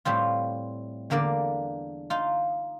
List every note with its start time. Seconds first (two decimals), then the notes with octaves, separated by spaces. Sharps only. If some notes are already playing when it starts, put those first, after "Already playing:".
0.05 A2 G3 C4 F4
1.10 E2 D3 A#3 A#4 D5
2.10 D#4 F4